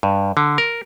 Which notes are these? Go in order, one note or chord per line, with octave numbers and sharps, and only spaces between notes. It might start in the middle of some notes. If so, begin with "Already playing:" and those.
G2
D3
A#4